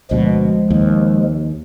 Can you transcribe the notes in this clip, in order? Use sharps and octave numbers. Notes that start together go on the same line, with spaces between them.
D2 B2 F3 G#3
D#2